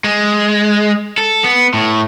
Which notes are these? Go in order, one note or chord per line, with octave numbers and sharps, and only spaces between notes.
G#3
A4
B3
A2